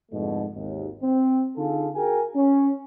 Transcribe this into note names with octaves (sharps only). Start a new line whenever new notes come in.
F2 G#2 B2 D3 A3
G#1 D#2
C4
D3 D#4 F4 G#4 A4
F#4 G#4 A#4 G5 G#5
C#4